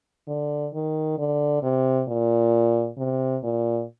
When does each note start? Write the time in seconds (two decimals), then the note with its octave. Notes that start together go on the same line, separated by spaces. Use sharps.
0.28 D3
0.74 D#3
1.19 D3
1.63 C3
2.08 A#2
2.98 C3
3.43 A#2